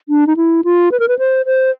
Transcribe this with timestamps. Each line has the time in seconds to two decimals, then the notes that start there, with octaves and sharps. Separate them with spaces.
0.09 D4
0.27 D#4
0.36 E4
0.64 F4
0.92 B4
1.00 A#4
1.08 B4
1.19 C5
1.46 C5